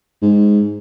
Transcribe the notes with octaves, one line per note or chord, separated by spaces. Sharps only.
G#2